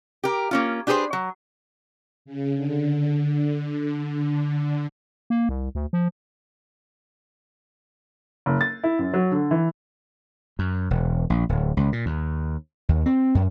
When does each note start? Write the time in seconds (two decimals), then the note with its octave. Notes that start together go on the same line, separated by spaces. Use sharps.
0.24 G4 A#4
0.51 A#3 C#4 F4
0.87 D4 G4 G#4 B4 C5
1.13 F#3
2.25 C#3
2.55 D3
5.30 A#3
5.49 C2
5.75 D2
5.93 F3
8.46 F#1
8.61 A6
8.84 E4
8.99 F#2
9.14 F#3
9.32 D3
9.51 E3
10.59 F#2
10.90 E1
11.30 A#1
11.49 D1
11.77 C#2
11.92 A#2
12.06 D#2
12.89 D#2
13.06 C4
13.35 F#2